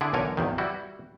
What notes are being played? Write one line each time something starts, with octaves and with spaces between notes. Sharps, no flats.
D3 D4 E4 G#4
B1 D3 E3 A#4 C#5 G#5
G#1 E2 D#3
G3 E4 F#4